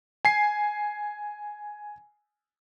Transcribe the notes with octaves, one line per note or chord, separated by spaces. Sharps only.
G#5 C7